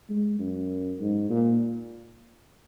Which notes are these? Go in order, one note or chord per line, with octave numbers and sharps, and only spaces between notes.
G#3
F#2
G#2
A#2